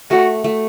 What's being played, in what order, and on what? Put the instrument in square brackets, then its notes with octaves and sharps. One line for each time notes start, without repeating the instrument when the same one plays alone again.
[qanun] A3 [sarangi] F#4
[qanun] A3